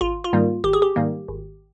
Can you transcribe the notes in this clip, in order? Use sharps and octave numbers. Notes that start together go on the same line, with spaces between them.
G#1 F4
F4
G#2 D#3 G3 A#3
G#1 G4
G#4
G4
G#2 D#3 G3 A#3
G#1